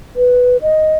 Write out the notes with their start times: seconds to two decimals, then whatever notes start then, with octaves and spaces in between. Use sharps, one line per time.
0.16 B4
0.62 D#5